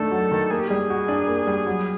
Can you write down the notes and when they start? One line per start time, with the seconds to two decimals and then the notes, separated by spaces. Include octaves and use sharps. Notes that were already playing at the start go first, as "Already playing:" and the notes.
Already playing: D#3 A3 D4 A4
0.11 F#3
0.31 D#3
0.50 A#3 G#4
0.60 G4
0.68 G3 G#4
0.90 F#4
1.08 D4
1.28 A#3
1.47 G3
1.66 F#3